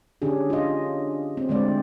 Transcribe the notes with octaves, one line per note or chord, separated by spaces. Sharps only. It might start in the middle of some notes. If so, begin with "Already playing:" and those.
D3 C#4 D4 G4 G#4
F4 D#5
C4
D3 G#3 A3 C4 D5